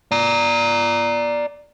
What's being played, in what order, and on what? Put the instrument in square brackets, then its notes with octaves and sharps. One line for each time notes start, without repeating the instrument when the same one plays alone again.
[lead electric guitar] D5 A#5